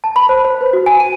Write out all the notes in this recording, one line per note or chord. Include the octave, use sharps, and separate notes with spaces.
A5
B5
C5
C5
B4
F#4
G#5
D#7